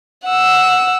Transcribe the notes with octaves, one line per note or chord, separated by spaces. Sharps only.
F#5 E6